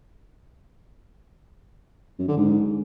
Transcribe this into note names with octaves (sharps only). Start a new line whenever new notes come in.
F#2
D3
G#2